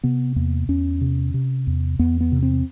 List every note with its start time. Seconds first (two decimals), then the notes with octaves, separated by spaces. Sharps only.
0.04 C3 B3
0.36 E2 A#3
0.68 E2 C#4
1.01 C3
1.34 C3
1.67 E2
1.99 E2 B3
2.21 B3
2.32 C3
2.43 C4